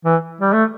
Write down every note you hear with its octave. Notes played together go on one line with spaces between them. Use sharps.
E3
G3
A3